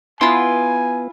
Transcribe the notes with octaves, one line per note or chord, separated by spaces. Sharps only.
B3 E4 F4 G#5 C6